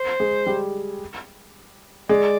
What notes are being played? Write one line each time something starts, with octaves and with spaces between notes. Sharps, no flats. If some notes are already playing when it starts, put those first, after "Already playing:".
Already playing: C5
G#3
G3
G#3 D5